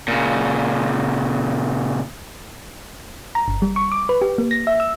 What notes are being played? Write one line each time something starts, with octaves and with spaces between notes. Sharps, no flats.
A#2 C#3
A#5
G1
G3
C#6
D6
B4
G4
A#3
A#6
E5
E6